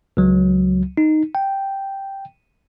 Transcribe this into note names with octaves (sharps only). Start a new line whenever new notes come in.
C#2 F#3
D#4
G5